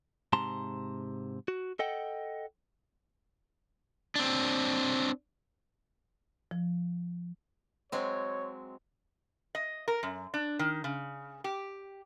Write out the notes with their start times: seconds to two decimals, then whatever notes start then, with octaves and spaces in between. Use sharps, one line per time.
0.33 G#2 C3 A5 A#5 C6
1.48 F#4
1.79 A4 D#5 F#5 G5
4.15 C4 D4
6.51 F3
7.92 F#3 G#3 C4 C#5
9.55 D#5
9.88 A#4
10.03 F#2
10.34 D4
10.59 D#3
10.84 C#3
11.44 G4